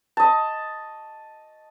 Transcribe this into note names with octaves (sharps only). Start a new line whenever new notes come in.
D#5 A5